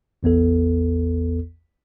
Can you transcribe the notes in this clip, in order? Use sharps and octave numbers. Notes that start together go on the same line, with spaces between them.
A1 E2 B3 A4